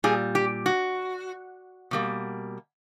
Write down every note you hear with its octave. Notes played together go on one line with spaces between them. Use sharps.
A#2 G3 G#4
G4
F#4
B2 G3 A#3